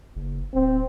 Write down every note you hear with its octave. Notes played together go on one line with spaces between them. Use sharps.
F#1
D1 C4